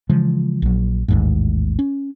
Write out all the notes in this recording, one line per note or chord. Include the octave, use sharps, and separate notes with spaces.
C#3 E3 F3 G#3
A#1 F#3
A1 D#2 G#2
C#4